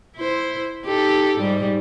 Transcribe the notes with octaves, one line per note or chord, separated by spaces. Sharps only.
E4 C5
D#4 G4 A4
G#2 G3 D#4